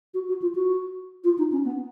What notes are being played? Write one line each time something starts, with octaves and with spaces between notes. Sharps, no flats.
F#4
F#4
F4
F#4
F4
D#4
C#4
B3